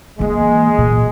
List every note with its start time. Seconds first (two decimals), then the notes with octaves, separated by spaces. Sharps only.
0.19 E3 G#3 A#3
0.78 A#2